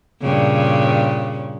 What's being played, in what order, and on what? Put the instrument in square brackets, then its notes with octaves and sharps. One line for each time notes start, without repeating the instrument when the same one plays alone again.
[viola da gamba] G2 A#2 C#3